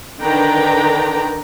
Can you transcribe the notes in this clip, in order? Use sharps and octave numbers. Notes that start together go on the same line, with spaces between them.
D3 D#3 D4 B4 G5 A#5